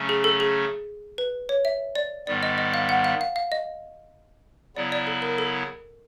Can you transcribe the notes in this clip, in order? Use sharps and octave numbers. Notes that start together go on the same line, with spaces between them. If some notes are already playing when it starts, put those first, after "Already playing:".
Already playing: C#3 F#3 A3 C#4
G#4
A4
G#4
B4
C#5
E5
D5
G#2 D#3 G3 B3 D5
D#5
D#5
F5
F#5
F5
F5
F5
D#5
C#3 F#3 B3 E4 D5
D5
A4
A#4
A4